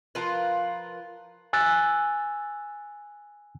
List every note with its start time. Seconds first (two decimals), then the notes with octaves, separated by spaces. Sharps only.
0.15 F3 F4 A#4 B4
1.53 G#5 E6 F#6 A6